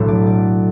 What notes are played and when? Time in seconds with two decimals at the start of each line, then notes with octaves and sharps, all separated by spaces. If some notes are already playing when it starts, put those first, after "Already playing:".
Already playing: B1 A2 F#3 A3 D4
0.08 D5
0.27 D5